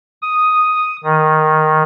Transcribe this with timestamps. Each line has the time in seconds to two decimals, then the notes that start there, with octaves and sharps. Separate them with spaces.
0.22 D#6
1.04 D#3